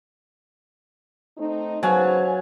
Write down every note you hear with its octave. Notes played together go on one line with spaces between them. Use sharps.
A3 C4 D#4
C#3 F#3 B4 C5 F5 G#5 A5